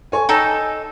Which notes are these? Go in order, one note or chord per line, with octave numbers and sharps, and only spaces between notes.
A4 C#5 G#5
D#4 A4 G5 G#5 E7